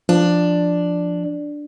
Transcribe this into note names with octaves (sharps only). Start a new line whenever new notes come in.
F3 D4